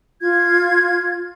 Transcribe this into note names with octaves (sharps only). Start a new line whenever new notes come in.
F4 G#6